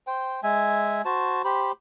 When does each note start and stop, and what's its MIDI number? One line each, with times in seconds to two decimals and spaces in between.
0.07 0.41 72
0.07 0.41 79
0.43 1.02 56
0.43 1.02 76
0.43 1.02 80
1.05 1.42 66
1.05 1.42 72
1.05 1.42 81
1.44 1.72 67
1.44 1.72 72
1.44 1.72 83